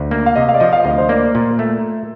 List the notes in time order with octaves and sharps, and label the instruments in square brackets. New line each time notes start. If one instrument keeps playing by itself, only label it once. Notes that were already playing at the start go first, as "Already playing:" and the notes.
Already playing: [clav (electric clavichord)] D2
A#3
[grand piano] F5
[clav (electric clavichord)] C3 [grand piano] D#5
[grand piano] F5
D5
[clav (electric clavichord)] F3 [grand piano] D#5
[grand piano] F5
[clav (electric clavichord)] D2 [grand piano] D#5
[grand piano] C5
[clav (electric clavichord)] A#3 [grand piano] D5
[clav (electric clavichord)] A#2
A3